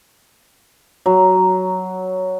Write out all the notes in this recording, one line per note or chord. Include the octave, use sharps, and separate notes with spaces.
F#3